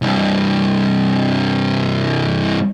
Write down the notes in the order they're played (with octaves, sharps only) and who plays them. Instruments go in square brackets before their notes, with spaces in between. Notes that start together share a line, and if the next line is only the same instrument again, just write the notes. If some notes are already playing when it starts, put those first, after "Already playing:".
[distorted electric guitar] C2 G2